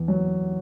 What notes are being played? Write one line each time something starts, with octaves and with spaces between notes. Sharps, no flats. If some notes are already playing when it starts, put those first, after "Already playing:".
Already playing: E2
F#3